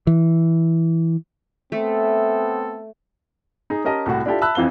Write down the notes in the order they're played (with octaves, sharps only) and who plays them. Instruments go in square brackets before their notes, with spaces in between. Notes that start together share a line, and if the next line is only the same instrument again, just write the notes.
[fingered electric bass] E3
[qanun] A3 [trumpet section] B3 C4 A4
[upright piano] D#4 G#4
C#4 G4 A#4 D#5 A5
C2 A2 F#4
D4 E4 F4 G4 A4
E5 A5 B5 E6 F#6
F2 E3 C4 F5 G7